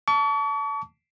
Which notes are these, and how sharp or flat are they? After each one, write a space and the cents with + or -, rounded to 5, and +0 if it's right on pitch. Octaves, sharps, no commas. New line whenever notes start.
A5 +0 C#6 +45